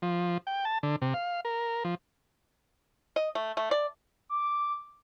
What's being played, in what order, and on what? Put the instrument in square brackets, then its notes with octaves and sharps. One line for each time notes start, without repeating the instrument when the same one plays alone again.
[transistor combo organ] F3
G5
A5
D3
C3
F5
A#4
F3
[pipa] D#5
A3
A3
D5
[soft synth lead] D6